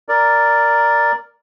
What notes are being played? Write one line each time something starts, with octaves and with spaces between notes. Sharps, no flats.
A#4 D5